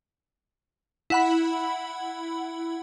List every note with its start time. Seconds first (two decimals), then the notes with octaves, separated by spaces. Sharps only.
1.10 E4 F#5 B5